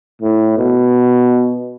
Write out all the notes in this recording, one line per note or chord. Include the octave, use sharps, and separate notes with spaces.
A2
B2